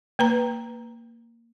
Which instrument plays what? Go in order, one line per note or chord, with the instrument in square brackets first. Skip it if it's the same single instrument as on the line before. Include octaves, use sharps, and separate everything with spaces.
[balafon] A#3 B4 A#5